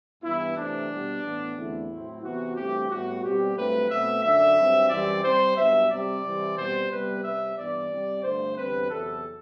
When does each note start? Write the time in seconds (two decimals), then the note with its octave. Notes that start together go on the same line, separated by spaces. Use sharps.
0.22 G2 E3 B3 E4
0.56 C3 E3 A3 C4 D4
0.89 B2 G3 B3
1.22 A2 E3 B3
1.56 E2 D3 A3 C4 E4
1.89 A2 F#3 A3 C4
2.22 C3 E3 B3 F#4
2.55 G2 E3 A3 C4 G4
2.89 A2 G3 B3 F#4
3.22 B2 G3 C4 G4
3.56 G2 F#3 A3 C4 B4
3.89 B2 A3 C4 E5
4.23 F#2 D3 F#3 E5
4.55 G2 F#3 C4
4.89 F#2 E3 G3 C4 D5
5.22 C3 G3 C4 C5
5.56 G2 F#3 B3 E5
5.90 C3 G3 C4 D5
6.23 C3 E3 G3 C4
6.56 B2 G3 C4 C5
6.90 C3 G3 B3 B4
7.23 C3 G3 C4 E5
7.57 G2 E3 B3 D5
7.89 C3 G3 C4
8.22 G2 D3 A3 C5
8.56 E2 D3 G3 C4 B4
8.89 E2 C3 F#3 A4